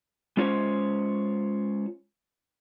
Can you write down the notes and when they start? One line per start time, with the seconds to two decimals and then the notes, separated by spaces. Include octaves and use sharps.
0.37 G#3 C#4 F4 C5 C#5